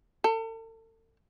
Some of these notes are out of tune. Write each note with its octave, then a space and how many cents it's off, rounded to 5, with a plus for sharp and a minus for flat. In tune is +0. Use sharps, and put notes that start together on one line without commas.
A4 +40